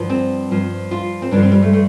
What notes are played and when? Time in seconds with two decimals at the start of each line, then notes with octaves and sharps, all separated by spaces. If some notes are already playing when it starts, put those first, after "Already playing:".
Already playing: G2 D3 F3
0.09 C4
0.51 G2 F3
0.91 F4
1.22 C4
1.31 G2 D3 F3 D4
1.42 C4
1.52 G3
1.62 A3
1.73 A3